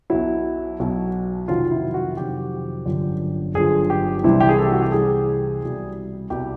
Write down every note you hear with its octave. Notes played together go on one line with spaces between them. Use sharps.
B1 B2 F#3 E4
B1 B2 F#3
F2 C3 D#3 F#3 F4
E4
F#4
F2 C3 D#3 F#3 G4
G1 F#2 D3 F3
G1 F#2 D3 F3 G#4
G4
C2 C3 E3 G3 E4
G4
G#4
A4
F#4
G4
C2 C3 E3 G3 G#4
C2 B2 G3
C2 B2 G3 G4